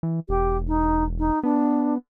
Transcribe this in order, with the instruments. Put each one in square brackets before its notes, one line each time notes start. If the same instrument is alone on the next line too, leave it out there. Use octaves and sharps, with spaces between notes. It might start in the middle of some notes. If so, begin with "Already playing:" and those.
[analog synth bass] E3
[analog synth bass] E1 [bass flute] G4
[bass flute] D#4
D#4
[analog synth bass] B3 [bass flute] D4